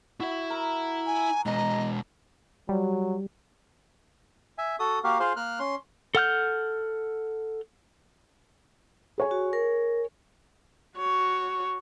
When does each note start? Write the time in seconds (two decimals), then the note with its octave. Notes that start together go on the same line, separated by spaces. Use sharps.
0.20 E4 F#4 E5
0.50 A#4
1.06 G#5
1.46 B2 G#3 B4 D#5 A#5
2.69 F#3 G3
4.58 E5 G#5
4.79 F#4 A4 D#6
5.04 A#3 F#4 G4 A#4 F5
5.20 F4 G#4 C5 F5
5.36 A#3 A#4 F6 F#6
5.59 C#4 C6
6.15 A4 F#5 F6 G6
9.18 G#4 C#5 G#5
9.31 F#4
9.53 A#4
10.98 F#4 C#5